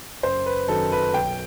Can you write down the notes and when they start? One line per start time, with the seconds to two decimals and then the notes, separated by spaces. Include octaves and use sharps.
0.23 F#1 C5
0.46 B4
0.68 F#2 D#3 F#3 A4
0.92 B4
1.14 B1 G5